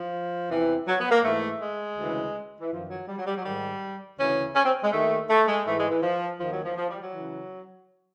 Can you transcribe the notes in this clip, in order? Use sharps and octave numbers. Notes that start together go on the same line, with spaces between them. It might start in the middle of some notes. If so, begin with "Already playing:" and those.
Already playing: F3
E2 C3 E3
F#3
B3
A#3
G#2 E3 A3
G#3
D2 C#3 E3
E3
F#2 D#3 F3
F#3
G3
F#3
G3
F#3
G#2 D#3 G3
D2 C#3 E3 C#4
C#4
C4
G#3
D#2 D#3 A3
A3
G#3
G#2 E3 A3
G#3
E3
F3
D#2 D#3 F3
F#3
F3
F3
G3
F#3
C#3 E3